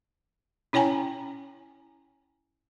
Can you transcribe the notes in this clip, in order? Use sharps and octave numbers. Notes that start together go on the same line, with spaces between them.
C#4 E4 C#5 G5 G#5 A#5